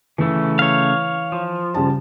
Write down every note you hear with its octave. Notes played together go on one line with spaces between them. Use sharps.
C#3 E3 A3
C#5 F5
F3
C#3 G3 A5